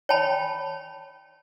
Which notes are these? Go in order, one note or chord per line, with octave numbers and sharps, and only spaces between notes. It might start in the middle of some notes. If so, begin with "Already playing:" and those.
C#5 G5 A5 B5